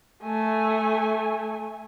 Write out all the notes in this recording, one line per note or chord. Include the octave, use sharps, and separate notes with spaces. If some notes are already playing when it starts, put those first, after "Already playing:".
A3 G#5